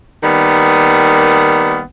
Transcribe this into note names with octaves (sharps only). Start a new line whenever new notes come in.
D#3 G3 A#3 B3